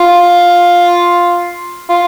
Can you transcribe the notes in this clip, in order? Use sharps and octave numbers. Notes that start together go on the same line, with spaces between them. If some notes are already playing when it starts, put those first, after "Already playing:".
Already playing: F4
F4